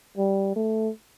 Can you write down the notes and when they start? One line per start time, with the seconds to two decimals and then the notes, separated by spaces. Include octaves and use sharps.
0.17 G3
0.56 A3